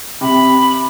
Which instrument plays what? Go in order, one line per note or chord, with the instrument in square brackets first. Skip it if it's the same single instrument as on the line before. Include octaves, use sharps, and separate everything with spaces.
[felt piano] C3 [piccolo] B5